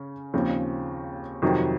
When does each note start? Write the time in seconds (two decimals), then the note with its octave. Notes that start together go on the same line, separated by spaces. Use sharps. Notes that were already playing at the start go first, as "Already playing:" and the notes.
Already playing: C#3 C#4
0.34 D#2 C#3 F3 C4
1.42 F2 C3 D#3 F#3